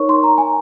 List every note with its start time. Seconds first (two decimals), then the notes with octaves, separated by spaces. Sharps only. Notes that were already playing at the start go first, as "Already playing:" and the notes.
Already playing: D#4 A#4 C#5 C#6
0.09 C6
0.24 A#5
0.38 G#5